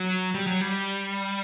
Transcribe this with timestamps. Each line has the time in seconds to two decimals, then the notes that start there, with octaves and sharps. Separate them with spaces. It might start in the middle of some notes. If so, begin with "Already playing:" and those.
Already playing: F#3
0.34 G3
0.47 F#3
0.61 G3